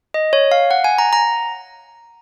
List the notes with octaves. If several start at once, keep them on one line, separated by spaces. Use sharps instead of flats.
D#5
C#5
F5
F#5
G#5
A#5
A#5